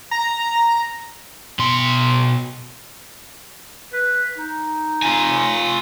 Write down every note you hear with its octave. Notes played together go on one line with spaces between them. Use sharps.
A#5
B2 C6
B4
D#4
F4 G#5